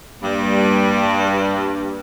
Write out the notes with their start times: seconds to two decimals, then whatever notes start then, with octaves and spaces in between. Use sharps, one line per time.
0.23 G2 G3 A#3